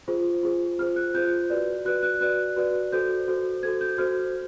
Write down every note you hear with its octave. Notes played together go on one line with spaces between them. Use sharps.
F4 G#4 C5
F4 G#4 C5
F4 G#4 C5 F6
F#6
F4 G#4 C5 G6
F#4 B4 D5
F#4 B4 D5 F#6
F#6
F#4 B4 D5 F#6
F#4 B4 D5
F#4 A4 C5 G6
F#4 A4 C5
F#4 A4 C5 G#6
G6
F#4 A4 C5 F6